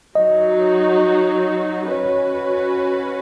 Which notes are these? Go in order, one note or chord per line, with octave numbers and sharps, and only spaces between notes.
F#3 D#4 F#4 D#5
C#4 F#4 B4 C#5